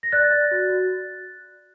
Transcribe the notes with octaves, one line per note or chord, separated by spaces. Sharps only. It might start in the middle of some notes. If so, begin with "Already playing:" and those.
A#6
D5 F#6 A6
D5
F#4
F#4